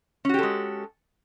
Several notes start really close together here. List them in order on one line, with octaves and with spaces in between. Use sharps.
C#4 F#4 G4 A4 G#3